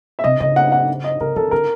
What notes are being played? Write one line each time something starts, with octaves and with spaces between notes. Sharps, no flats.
E5
C3 D#5
C#3 D#5
F#5
F#5
D#5
C#3 A#4
D#3 A4
D3 A#4